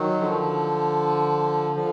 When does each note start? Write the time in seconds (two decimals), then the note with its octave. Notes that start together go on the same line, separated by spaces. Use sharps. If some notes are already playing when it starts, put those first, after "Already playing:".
Already playing: D#3 F#3
0.20 D3 F3
1.76 D3 F3